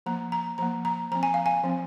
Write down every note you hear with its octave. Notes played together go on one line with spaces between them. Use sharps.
F3 A#3 A#5
A#5
F3 A#3 A#5
A#5
F3 C4 A#5
G#5
F5
G#5
F3 C4